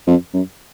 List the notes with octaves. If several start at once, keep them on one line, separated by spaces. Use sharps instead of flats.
F2
F#2